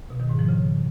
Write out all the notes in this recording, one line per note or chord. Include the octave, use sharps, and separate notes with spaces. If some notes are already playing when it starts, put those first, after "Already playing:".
B2
D#3
G#2
F3
C#3